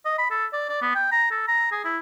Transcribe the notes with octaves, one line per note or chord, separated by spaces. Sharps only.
D#5
B5
A4
D5
D5
B3
G5
A#5
A4
A#5
G#4
E4